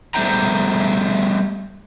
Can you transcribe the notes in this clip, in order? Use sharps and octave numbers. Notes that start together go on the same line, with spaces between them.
G3 A3 B3 C5 G5 A#5